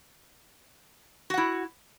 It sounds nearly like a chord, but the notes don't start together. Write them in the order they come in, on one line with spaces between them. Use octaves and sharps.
F#4 F#5 E4